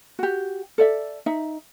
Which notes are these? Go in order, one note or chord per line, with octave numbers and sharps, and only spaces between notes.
F#4 G4
A4 D5 E5
D#4 E5